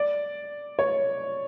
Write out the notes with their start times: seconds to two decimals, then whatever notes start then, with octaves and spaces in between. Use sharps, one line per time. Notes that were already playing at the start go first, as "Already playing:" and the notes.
Already playing: D5
0.79 C#5